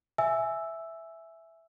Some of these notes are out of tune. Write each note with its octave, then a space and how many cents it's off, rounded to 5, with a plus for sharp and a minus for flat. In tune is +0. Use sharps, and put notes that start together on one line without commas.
E5 +0 G#5 +5 E6 +0